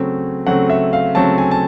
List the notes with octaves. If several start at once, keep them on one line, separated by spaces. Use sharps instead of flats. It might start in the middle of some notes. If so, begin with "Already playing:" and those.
Already playing: C#3 F#3 A3 C4
C#3 F#3 A3 C4 F#5
E5
F5
C#3 F#3 A3 C4 A5
G#5
A5